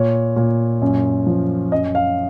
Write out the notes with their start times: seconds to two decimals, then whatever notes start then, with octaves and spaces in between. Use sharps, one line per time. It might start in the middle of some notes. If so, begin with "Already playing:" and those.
Already playing: A#2 C#5
0.36 A#2
0.82 F#2
1.27 F3
1.72 F#2 D#5
1.95 F5